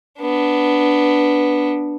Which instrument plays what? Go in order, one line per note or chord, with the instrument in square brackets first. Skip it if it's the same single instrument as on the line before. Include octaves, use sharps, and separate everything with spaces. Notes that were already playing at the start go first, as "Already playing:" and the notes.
[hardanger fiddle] B3 D4